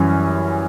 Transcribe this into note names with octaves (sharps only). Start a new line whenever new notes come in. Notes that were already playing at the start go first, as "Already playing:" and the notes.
Already playing: F#2 E3 G3 C#4